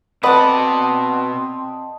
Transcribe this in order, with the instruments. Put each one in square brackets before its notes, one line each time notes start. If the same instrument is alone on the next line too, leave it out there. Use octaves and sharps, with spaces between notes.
[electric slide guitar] B2 F#5 [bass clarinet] C4 [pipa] B4 D5 [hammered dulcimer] D#5 A5